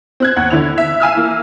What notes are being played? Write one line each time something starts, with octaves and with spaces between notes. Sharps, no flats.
C4 F#6 G#6
D#2 F#5
D3 E4 F7
E5
F5 G#5 E6 F6
E3 A#3